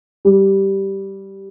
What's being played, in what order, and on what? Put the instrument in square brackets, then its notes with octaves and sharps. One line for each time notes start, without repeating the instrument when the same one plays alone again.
[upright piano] G3